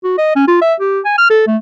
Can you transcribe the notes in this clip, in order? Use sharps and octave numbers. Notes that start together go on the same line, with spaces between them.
F#4
D#5
C#4
F4
E5
G4
G#5
F6
A4
A3